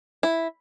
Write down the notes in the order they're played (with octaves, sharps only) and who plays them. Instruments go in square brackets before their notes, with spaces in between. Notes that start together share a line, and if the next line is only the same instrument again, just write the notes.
[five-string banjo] E4